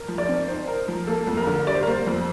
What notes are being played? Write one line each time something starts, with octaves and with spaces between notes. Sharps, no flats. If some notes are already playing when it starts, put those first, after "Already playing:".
Already playing: A#4
F3
D5
C4
D#4 C5
A#4
F3
A#3 A4
F2
A#4
D3
G3 D5
C5
A#4
A#3 C5
F2